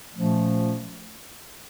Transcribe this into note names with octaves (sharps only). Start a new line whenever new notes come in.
A#2 F3 A3 C#4